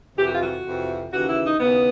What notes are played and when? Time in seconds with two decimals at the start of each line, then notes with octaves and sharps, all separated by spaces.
0.17 F2 C3 E3 G4
0.25 F#4
0.33 F4
0.41 F#4
0.65 F2 C3 E3
1.12 D#2 C#3 E3 F#4
1.28 E4
1.44 D#4
1.59 D#2 C#3 E3 B3